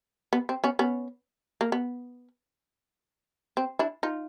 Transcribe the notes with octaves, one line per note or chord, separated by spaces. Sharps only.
B3
C4
B3 C#4
B3 C#4
A#3
B3
C4
D4 E4
D#4 F4